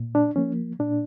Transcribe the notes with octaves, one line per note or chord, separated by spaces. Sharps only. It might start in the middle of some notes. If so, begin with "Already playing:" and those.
Already playing: A#2
D4
F3 A#3 C#4
A#2 D4